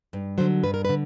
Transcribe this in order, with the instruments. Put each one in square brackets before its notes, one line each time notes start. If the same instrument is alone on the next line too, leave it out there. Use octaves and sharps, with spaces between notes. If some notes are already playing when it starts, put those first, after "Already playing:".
[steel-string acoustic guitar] G2
D3 F#3 C5
G2 B4
A#4
B4
D3